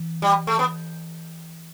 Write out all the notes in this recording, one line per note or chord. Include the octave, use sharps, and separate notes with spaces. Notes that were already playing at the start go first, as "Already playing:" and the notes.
Already playing: E3
G3
A3
B3